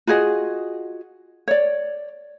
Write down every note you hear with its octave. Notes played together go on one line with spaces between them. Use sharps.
F4 F#4 G#4 D#5
C#5 D5